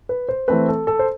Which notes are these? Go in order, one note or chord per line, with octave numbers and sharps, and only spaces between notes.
B4
C5
E3 A3 C4 B4
A4
A4
C5